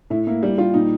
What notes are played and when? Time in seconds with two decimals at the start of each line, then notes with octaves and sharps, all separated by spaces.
0.10 A2 E4
0.27 A#3 E4
0.43 G3 E4
0.58 G3 F4
0.74 A#2 D#4